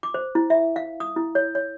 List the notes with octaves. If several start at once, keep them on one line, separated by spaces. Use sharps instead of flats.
D6
C5
E4
E5
F5
D#6
E4
C#5
C#5